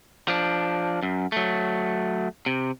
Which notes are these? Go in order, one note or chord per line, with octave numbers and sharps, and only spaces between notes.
F3 D4
F#2
F#3 A3
C3